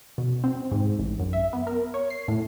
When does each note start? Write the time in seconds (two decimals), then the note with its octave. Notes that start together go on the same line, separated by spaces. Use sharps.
0.18 B2
0.44 C4
0.72 G#2
0.99 A1
1.20 F#2
1.33 E5
1.53 B3
1.67 A#4
1.94 C#5
2.10 C7
2.28 A2